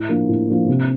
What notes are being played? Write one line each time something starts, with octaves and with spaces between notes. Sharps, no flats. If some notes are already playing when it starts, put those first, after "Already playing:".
Already playing: A2
F3 A#3 D4
A2
F3 A#3 D4
C3